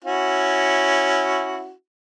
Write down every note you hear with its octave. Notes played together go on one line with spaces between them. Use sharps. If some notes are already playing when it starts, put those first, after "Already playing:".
C#4 E4 F#4